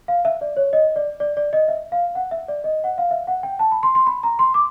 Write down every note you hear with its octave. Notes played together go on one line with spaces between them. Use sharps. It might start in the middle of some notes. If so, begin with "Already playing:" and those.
F5
E5
D5
C#5
D#5
D5
D5
D5
D#5
E5
F5
F#5
E5
D5
D#5
F#5
F5
E5
F#5
G5
A5
B5
C6
C6
B5
A#5
C6
D6